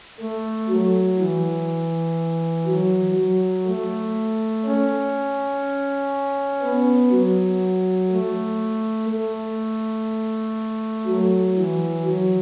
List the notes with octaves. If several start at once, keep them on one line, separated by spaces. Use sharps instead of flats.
A3
F#3
E3
F#3
F#3
A3
C#4
B3
F#3
A3
A3
F#3
E3
F#3